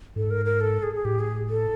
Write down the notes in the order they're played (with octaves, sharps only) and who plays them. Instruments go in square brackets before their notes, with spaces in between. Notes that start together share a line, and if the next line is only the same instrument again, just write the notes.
[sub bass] G#2 [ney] A4
[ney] A#4
A#4
A4
G#4
G#4
[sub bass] A2 [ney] G4
[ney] G#4
A4